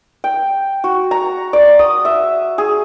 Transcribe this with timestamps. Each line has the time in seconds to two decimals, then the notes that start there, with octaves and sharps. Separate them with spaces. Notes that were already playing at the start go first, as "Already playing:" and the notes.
0.24 G5
0.84 F#4
1.11 A#5
1.53 D5
1.79 D#6
2.05 E5
2.58 G#4